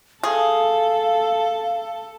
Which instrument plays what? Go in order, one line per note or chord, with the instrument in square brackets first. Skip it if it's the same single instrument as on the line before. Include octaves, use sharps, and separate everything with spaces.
[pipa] G#4 [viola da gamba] A4 [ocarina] F5